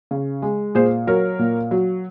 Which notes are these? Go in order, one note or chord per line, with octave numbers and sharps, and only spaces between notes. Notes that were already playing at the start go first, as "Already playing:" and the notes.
C#3
G#3
A#2 G#4 C5
F#3 A#4 C#5
A#2
F#3